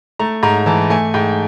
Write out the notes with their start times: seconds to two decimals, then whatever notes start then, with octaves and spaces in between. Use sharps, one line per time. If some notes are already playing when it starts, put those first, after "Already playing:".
0.19 A3 A#5
0.43 G#2 A#5
0.66 E3 A5
0.90 A3 G#5
1.14 G#2 G5